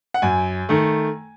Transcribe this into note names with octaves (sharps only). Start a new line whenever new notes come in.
F#5
F#2 G#5
D#3 A3